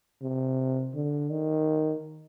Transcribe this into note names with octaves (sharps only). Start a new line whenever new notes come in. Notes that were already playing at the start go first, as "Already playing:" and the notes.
C3
D3
D#3